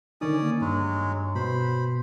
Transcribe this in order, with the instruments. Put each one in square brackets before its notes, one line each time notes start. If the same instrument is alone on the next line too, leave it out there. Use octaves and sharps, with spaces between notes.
[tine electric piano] D3 D#3 D#4 [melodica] C#4 D5 D#6
[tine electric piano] A#3
[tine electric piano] G2 [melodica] F#3 G#3
[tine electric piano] B2 B3 [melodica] C5 B5